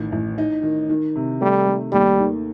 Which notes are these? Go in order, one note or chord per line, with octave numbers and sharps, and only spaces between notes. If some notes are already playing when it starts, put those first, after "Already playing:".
Already playing: A1 D#3
A1
D#4
D#3
D#3
C3
G3 A3
A3
D#2 G3
D#3